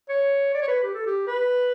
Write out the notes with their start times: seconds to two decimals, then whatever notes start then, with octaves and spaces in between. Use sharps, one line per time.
0.09 C#5
0.54 D5
0.61 C#5
0.68 B4
0.83 G4
0.94 A4
1.06 G4
1.27 B4